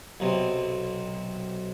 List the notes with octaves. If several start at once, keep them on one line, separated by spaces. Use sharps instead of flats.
B1 C3